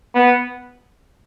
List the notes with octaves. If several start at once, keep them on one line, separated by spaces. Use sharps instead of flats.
B3